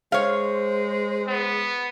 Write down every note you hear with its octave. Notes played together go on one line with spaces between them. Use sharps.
G#3 C5 C#5 F5
B3